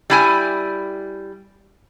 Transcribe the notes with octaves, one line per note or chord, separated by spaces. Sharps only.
G3 E4 G#5